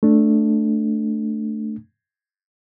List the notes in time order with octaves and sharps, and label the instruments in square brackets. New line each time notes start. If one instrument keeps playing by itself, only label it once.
[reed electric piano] A3 D4